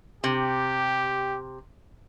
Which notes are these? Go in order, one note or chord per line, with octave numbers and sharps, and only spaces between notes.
C3 G4